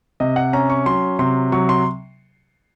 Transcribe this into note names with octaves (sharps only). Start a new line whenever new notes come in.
C3 D#5
F#5
C#4 A#5
C#6
F#3 C6
C3 C6
F#3 C#6
C6